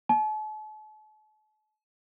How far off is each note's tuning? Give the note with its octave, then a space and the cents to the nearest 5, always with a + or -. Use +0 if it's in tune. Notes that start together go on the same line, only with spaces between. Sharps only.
A5 -45